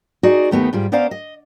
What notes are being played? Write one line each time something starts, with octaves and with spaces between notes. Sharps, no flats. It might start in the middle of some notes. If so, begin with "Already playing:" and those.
D#4 F#4 G#4 D5
D#2 A3 B3 D#4 G4
G#2 G3 F4
B3 C#4 C5 D5 F5 A#5
D#5